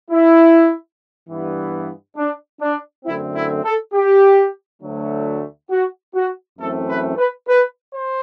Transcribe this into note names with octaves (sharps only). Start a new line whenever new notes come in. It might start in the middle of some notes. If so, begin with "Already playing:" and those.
E4
G2 E3 B3
D4
D4
F#2 D3 A3 C4 E4
E4
A4
G4
D2 D3 F#3 A3
F#4
F#4
F#2 E3 A3 C4 A4
B4
B4
B4
C5